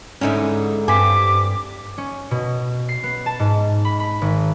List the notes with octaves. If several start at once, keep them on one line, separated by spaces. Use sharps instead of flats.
G#2 D3 C#4 D#4 E4
G2 C4 G#5 D6 B6
C#4
B2
C7
B3
A5
G#2
B5
B5
G#1